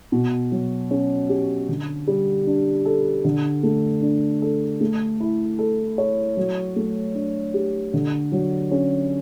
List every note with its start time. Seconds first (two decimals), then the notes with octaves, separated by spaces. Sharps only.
0.12 B2
0.52 F#3
0.91 C#4
1.29 G4
1.69 D3
2.07 G3
2.47 D4
2.86 A4
3.25 D3
3.63 A3
4.02 D4
4.42 A4
4.81 A3
5.20 E4
5.59 A4
5.98 C#5
6.37 F#3
6.76 A3
7.15 D4
7.54 G4
7.94 D3
8.32 F#3
8.71 C#4